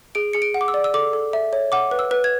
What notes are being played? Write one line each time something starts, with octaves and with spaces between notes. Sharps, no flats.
G#4 D7
G#4 C#7
D7
F#5
D6
E6
D5
E6
A4 D6
A4
E5
C#5
F#5 D6
B4
E6
B4
G#6